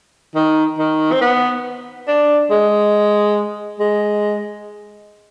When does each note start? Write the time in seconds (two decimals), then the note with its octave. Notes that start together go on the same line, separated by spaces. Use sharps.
0.35 D#3
0.78 D#3
1.12 C4
1.21 B3
2.08 D4
2.51 G#3
3.80 G#3